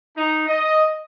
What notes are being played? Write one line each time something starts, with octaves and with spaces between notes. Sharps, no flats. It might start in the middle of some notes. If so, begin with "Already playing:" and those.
D#4
D#5